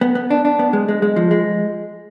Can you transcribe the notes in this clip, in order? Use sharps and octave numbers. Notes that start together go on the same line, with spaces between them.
B3
B3
D4
D4
B3
G#3
G#3
G#3
F3
G#3